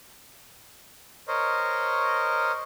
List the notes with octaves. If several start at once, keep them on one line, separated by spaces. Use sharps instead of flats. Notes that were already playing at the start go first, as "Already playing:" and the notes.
A#4 C5 C#5 D#5